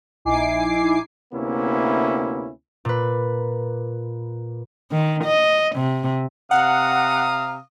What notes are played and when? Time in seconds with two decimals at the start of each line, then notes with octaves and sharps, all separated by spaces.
0.25 A#1 D#4 E4 G#5 D6 C7
1.33 D2 C3 A#3 B3 C#4 E4
2.85 A#2 B4
4.92 D#3
5.24 D#5
5.76 C3
6.51 C3 F5 F#5 A#5 D#6